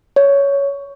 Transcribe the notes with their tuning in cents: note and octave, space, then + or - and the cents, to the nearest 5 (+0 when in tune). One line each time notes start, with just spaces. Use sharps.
C#5 +10